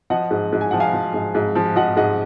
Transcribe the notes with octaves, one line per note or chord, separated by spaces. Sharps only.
F3 D#5 F#5
G#2
G#2
G#5
F3 F#5
F5 G#5
F3
G#2
G#2
F3
F3 D#5 F#5
G#2 D#5 F#5